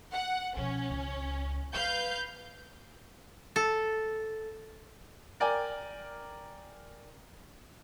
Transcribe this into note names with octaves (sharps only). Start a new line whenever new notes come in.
F#5
B2 F3 C#4
C#2
G3 F4 B4 F5 G6
A4
A#4 D5 G5 G#5